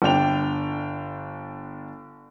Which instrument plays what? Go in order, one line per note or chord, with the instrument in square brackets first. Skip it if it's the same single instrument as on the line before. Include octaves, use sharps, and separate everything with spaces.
[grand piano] G1 D4 G5 F7